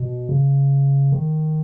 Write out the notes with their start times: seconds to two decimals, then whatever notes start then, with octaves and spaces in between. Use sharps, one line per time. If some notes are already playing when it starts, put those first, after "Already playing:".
Already playing: B2
0.29 C#3
1.12 D#3